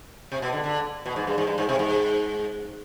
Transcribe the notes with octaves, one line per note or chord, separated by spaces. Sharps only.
C3
B2
D3
D3
B2
G#2
G2
G#2
G2
G#2
C3
G#2